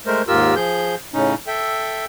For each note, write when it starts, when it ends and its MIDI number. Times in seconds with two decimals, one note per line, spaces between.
0.07 0.22 56
0.07 0.22 57
0.07 0.22 70
0.07 0.22 72
0.28 0.55 39
0.28 0.55 44
0.28 0.55 65
0.28 0.55 67
0.28 0.55 70
0.28 0.55 88
0.56 0.95 53
0.56 0.95 68
0.56 0.95 91
1.14 1.35 45
1.14 1.35 49
1.14 1.35 61
1.14 1.35 63
1.47 2.05 69
1.47 2.05 76
1.47 2.05 79